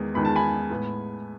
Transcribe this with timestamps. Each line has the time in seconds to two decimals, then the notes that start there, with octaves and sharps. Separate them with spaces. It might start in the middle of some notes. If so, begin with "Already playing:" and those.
Already playing: E2 D#3 G#3 B3
0.14 E2 D#3 G#3 B3 B5
0.25 A5
0.36 G#5 B5
0.70 A2 G#3 B3